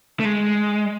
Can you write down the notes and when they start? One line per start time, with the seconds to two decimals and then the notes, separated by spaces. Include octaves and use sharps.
0.20 A3
0.25 G#3